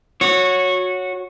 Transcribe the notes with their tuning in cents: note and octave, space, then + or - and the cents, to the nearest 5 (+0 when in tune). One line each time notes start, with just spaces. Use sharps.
F#4 -15 C#5 +0